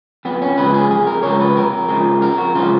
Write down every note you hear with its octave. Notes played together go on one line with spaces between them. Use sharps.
F2 B3
C#4
C#3 F3 G#3 B4
G#4
F2 G#4
A#4
C#3 F3 G#3 C#5
B4
F2 A#4
C#3 F3 G#3
F2 A#4
F#4
C#3 F3 G#3 F4